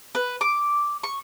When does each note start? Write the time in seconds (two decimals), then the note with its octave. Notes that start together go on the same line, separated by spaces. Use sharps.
0.15 B4
0.41 D6
1.03 C#6